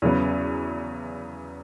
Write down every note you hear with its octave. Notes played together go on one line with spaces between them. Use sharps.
E2 C#3 F#3 B3